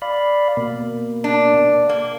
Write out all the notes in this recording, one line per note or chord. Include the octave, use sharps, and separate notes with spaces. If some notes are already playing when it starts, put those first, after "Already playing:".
D5 F5 B5
B2 A#3
D4
A#3